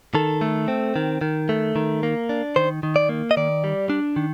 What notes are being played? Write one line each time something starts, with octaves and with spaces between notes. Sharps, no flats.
D#3 A4
A3
C4
D#3
D#3
A3
D#3
A#3
D4
D#3 C5
D#3
D5
A#3
D#5
D#3 D5
G3
D4
D#3